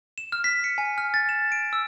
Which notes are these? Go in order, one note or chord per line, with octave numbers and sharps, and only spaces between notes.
E7
F6
B6
C#7
G#5
F6
A6
E7
D7
E6